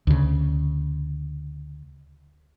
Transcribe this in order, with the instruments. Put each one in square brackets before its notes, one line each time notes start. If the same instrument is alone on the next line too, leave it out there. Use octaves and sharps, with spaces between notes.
[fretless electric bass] D2 C#3